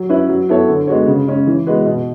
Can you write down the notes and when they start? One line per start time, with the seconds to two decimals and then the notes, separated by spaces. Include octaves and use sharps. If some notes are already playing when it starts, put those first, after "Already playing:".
Already playing: F#3
0.09 C#4 E4 B4
0.29 F#3
0.49 B3 E4 A4 C#5
0.68 D3
0.87 G#3 B3 F#4 C#5
1.07 C#3
1.27 G#3 C#4
1.47 E3
1.67 G#3 B3 F#4 B4
1.85 B2